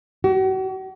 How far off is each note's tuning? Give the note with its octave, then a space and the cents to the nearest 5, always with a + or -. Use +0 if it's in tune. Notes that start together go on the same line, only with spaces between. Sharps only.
F#4 +40